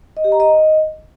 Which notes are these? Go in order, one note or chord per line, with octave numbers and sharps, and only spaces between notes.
D#5
G4
A#5
D#5